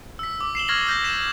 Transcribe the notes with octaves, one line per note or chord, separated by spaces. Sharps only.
E6 B6
D6
C7 E7 F#7 G7
C#6 F6 G#6 A#6 C7 F#7
F6 G6 A#6
B6 E7